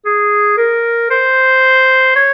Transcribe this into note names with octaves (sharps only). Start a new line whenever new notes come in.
G#4
A#4
C5
C#5